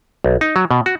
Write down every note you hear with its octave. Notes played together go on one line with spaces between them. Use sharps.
B1
D#4
F#3
B2
F#4